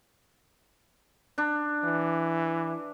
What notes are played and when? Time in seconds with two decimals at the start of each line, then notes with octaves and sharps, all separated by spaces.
1.38 D4
1.84 E3